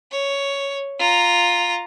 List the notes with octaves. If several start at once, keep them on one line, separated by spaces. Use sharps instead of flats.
C#5
F4 A#5